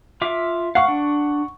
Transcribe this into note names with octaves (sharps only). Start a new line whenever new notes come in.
F4 E5 D6
F5 F#5 C#6
D4